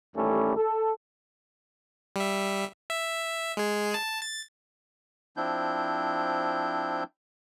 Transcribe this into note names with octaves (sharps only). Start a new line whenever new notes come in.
A1 D#2 G3 A3 C#4 A4
A4
G3 E5
E5
G#3 G#4
A5
A6
F3 C4 D4 E4 G6